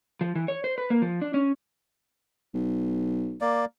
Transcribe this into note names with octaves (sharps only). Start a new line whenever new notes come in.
F3
E3
C#5
C5
B4
A#3
F3
D4
C#4
B1
A#3 D5